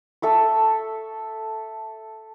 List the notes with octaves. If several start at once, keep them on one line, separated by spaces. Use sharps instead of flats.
A4 E5 C#6